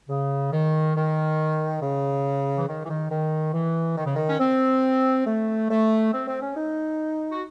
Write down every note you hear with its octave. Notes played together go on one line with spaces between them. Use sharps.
C#3
D#3
D#3
C#3
E3
D#3
E3
D#3
D#3
E3
D#3
C#3
D#3
C#4
C4
A3
A3
C4
C4
C#4
D#4
F#4